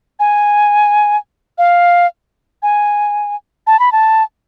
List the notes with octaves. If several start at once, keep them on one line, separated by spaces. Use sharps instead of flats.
G#5
F5
G#5
A5
B5
A5